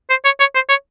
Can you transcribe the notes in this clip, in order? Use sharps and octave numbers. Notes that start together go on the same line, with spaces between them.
C5
C#5
C#5
C5
C#5